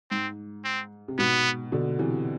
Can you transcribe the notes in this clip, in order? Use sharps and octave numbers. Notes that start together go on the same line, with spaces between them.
G#2 C4
C4
C3
G#2 B2 B3
B2 D3
C3 E3